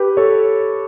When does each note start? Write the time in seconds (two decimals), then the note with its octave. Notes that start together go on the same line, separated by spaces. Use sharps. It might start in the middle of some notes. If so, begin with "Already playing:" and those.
Already playing: G4 B4
0.17 A4 C#5